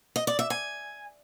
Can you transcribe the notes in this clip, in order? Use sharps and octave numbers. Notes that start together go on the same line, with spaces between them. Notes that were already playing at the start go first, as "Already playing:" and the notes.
D#5
D5
E5
G#5